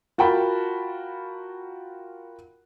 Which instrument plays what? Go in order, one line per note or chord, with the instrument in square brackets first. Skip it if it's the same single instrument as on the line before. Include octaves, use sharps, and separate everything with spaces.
[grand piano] F4 F#4 A#4 G5 A5 B5